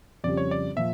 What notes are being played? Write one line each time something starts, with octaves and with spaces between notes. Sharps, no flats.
F2 C#3 G3 D5
C#5
D5
A#2 F3 E5